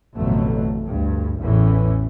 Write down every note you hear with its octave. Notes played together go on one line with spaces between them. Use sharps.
A1 F2 B2 D3 F#3 A3
D2 G2
A1 E2 A2 E3 C#4